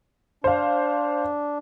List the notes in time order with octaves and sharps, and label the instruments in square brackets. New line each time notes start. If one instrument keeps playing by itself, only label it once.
[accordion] D4 [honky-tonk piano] C5 F5